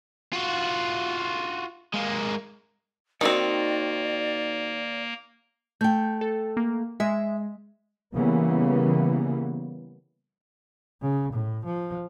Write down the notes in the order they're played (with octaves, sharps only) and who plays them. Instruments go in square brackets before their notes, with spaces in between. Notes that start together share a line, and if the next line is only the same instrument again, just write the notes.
[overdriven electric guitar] F4 F#4
G#3 A#3
[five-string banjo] D#3 C4 [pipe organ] A#3 [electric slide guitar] D#4 F#4 [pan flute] D5
[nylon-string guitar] A3 G5 [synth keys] G6
[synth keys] A4
A#3
[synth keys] G#3 [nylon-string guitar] E5
[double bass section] C#3 E3 G3 A#3 B3
[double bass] C#3
A2
F3